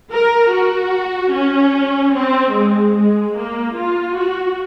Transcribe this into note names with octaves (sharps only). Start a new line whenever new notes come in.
A#4
F#4
C#4
C4
G#3
G#3
A#3
F4
F#4